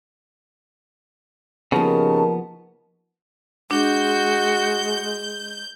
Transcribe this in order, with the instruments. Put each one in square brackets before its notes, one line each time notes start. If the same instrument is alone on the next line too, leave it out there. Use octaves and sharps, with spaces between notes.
[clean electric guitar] C#3 [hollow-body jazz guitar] F3 A#3 B3 [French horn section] D#4 G4 A#4 [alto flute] A5
[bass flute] G#3 [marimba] D4 [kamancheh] F#4 [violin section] G6